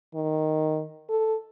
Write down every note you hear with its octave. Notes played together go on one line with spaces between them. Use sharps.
D#3
A4